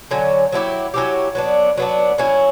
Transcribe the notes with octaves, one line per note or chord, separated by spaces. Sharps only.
D3 F#3 C#4
F#3 C#4 E4 G4
F#3 C#4 E4 G4
F#3 B3 D4
F#3 B3 D4
F#3 C#4 E4